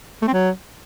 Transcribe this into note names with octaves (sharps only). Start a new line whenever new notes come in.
A3
C4
F#3